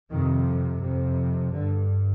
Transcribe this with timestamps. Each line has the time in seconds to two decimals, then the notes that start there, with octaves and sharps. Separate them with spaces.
0.10 F2 C3 D#3
0.81 F2 C3
1.52 G2 D3